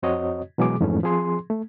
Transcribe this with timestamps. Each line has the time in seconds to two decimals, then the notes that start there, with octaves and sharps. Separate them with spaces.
0.03 F2 C4 F#4 C#5 D#5
0.58 B2 E3 F#3 G#3 G#4 D6
0.80 F2 G#2 E3 A3 C#4
1.03 F3 C4 G#4 C6
1.50 A3